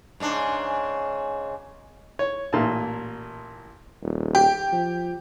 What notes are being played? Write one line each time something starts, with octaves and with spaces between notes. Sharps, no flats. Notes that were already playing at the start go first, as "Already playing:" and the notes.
G#2 C#3 D4
C#5
A1 A#2 A5
D#1
G4 G5
F3